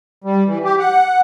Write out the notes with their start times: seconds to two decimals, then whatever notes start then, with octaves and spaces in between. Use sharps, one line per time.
0.24 G3
0.47 E3
0.65 G4
0.79 F#5